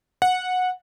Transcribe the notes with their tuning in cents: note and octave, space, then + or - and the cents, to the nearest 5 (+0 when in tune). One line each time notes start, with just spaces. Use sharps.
F#5 -15